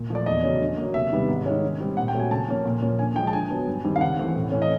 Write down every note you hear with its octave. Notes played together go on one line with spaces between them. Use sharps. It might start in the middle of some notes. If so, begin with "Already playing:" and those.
Already playing: A#2
F3 A3 D5
E2 D#5
C#3 F#3 A3 C#4
D3
F#3 A#3
C3 E5
D#3 G3 B3
G#2
D#3 G#3 C#4
D3
G3 C4
A#2 F#5
G5
F#3 A3 C4
G#5
C#3 A5
F3 A#3 C#4
A#2
F3 A#3 C#4
D3 G#5
F3 G#3 G5
A5
D3 G#5
F#3 B3
G2
D#3 G3 C4
F5
C#3 F#5
E3 A3 C4
A2
E3 A3 C#4
D#5